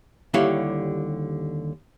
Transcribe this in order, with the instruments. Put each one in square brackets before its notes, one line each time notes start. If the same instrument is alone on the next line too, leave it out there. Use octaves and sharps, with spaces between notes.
[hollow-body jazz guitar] D#2 D3 G3 E4 C#5 F5